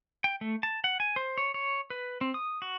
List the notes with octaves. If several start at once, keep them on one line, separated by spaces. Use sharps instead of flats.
G5
A3
A5
F#5
G#5
C5
C#5
C#5
B4
C4
D#6
F#4